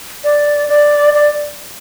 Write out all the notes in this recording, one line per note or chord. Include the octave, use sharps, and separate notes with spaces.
D5
D5
D5